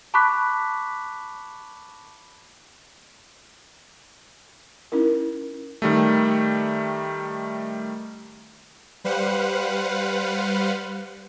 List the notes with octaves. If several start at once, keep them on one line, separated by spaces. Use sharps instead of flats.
A5 B5 C#6 D6 F#6 B6
C#4 D#4 E4 A#4
D#3 G3 A3
G3 B4 C5 F5 F#5